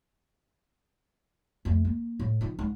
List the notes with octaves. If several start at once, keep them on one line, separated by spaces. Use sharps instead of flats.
F2 A3
A#3
A2
D#3 F3
G#2